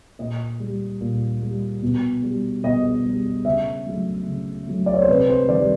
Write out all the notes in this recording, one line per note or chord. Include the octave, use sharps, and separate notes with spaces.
A#2 D#5
G3
A#2
G3
B2
G3
B2 D#5
G3
C#3 E5
F#3 A3
C#3
F#3 A3
D5
C#5
C5
C3 B4
C5
D#3 G3 D5